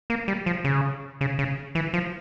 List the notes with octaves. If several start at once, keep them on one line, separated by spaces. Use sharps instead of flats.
A#3
G3
F3
C#3
C#3
C#3
E3
F3